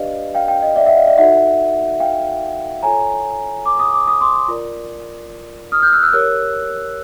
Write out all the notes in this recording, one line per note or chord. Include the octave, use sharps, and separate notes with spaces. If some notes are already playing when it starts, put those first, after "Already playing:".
Already playing: D4 G4 B4 D5 D#5 F5
F5 G5
F5 G5
D#5
D5 E5
E5 F#5
D#5 F5
D5 E5
D#4 F#4 A4 E5 F#5
F5 G5
F4 A4 C#5 G#5 A#5
D6
D#6
D6
D#6
C6 D6
F4 A#4 D5
D#6 F6
F6 G6
E6 F#6
E6 F#6
G4 A#4 C#5 E6 F#6